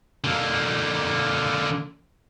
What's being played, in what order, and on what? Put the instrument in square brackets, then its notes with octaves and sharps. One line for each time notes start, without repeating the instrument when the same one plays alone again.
[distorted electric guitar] D3 A#3